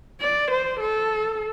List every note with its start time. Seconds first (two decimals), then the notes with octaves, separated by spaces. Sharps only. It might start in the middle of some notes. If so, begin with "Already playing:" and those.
0.21 D5
0.51 C5
0.80 A4